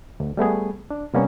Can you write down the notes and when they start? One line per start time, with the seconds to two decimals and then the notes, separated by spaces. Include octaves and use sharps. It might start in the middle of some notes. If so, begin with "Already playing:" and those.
0.20 D2
0.37 G3 A3 B3 G#4
0.90 D4
1.14 C3 G3 A#3 B3 C#4